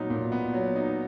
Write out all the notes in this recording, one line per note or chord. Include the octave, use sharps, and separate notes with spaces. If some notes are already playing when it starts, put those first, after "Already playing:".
Already playing: A#2 F#3 B3 D#4
A#2
B3
F#3
D#4